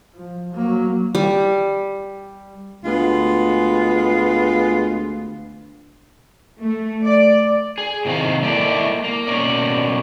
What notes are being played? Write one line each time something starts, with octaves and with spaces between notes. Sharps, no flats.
F3
F#3 A#3
G3
D2 G#3 B3 F4
A3
D5
G#4
A2 C3 D#3 F5
G#3 A#3 E4 A4 D5 E5
A#3
B2 A#3 C#4 D5